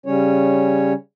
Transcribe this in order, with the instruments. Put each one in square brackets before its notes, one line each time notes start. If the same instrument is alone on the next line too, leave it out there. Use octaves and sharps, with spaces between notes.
[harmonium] C#3 G3 C#4 C#5